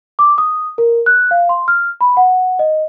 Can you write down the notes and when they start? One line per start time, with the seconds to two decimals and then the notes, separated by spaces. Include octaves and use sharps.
0.19 D6
0.38 D#6
0.78 A#4
1.06 F#6
1.31 F5
1.49 C6
1.68 F6
2.01 B5
2.17 F#5
2.59 D#5